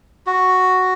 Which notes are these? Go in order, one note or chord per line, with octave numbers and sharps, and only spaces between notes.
F#4